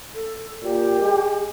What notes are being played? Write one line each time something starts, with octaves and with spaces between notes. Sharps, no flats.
A4
A#2 G4
G#3